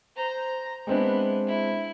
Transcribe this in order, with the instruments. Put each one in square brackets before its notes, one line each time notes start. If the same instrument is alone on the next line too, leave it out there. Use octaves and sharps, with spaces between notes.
[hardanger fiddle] C5 A#5
[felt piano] G#3 C4 D4 [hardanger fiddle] B3 E4
[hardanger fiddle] E4